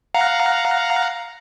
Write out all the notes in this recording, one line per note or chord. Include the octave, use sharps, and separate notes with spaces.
F5 F#5 A#5